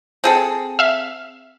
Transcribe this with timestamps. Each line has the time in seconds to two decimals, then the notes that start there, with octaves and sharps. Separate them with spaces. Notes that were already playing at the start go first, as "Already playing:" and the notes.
0.24 C4 G#4 A4
0.79 E5 F5